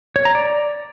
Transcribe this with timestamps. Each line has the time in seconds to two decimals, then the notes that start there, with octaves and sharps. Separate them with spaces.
0.16 C#5
0.25 A#5
0.35 D5